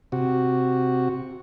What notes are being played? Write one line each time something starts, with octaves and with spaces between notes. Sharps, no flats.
C3 F#4